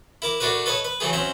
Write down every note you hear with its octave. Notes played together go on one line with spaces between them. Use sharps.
E4 A#4 D6
A3 D4 F#4 A#4 B4
A4 B4 C#5 D#5
B4
E3 F#3 A3 G#4
F#3 C4 C#4 E5